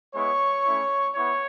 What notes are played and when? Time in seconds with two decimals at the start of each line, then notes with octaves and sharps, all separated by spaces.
0.14 G#3 B3 E4 C#5 C#6
0.66 A3 C#4 E4
1.15 B3 E4 C#5 C#6